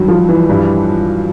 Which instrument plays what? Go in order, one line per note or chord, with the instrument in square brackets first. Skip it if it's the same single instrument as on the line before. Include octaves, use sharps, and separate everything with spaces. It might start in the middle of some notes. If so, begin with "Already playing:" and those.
Already playing: [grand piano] G2 D#3 [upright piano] F#3 G3
[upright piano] F3
E3
[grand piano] G2 E3 G3